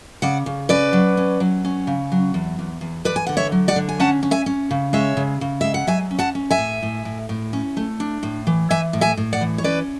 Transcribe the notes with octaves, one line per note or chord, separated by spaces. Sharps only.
C#3 D5 F#5
C#3
C#4 B4 D5
F#3
C#4
F#3
C#4
C#3
F#3
E2
E2
E2
E2 B4 D5
G#5
D3 F#5
C#5 E5
F#3
D5 F#5
D3
G#5
C#4 F#5 A5
C#4
E5 G#5
C#4
C#3
G#3 C#5 E5
C#3
C#3
G#3 E5
F#5
F#3 E5 G#5
C#4
F#5 A5
C#4
E5 G#5
A2
A2
A2
A2
C#4
A3
D4
A2
E3
E3 E5 G#5
A2
E5 G#5
A2
D5 F#5
E3
C#5
C#4 B4 D5